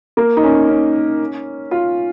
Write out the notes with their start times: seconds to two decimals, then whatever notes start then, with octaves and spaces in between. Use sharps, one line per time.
0.17 A#3
0.37 D#4
0.43 C#4
0.69 C#4
1.71 F4